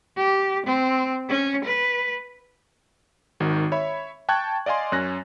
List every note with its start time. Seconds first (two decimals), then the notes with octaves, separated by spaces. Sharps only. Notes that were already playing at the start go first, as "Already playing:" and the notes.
0.16 G4
0.66 C4
1.29 C#4
1.64 B4
3.40 G#1 D#3 F#4
3.72 C#5 E5 B5
4.29 G5 A5 C#6 F#6 G#6
4.66 D5 D#5 F5 G#5 C6
4.92 F#2 C#4 F#6 A#6